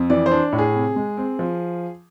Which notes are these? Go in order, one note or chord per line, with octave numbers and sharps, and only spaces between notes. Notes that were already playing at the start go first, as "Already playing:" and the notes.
Already playing: F2
E3 D5
C5
D4
A2
G#4
C3
G#3
C4
F3